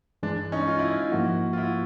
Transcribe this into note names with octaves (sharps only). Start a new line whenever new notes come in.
G2 E3 G#3 D4
C#4 D#4
F4
E4
D#4 F4
G#2 F3 A#3 E4 F#4
F4
E4 F#4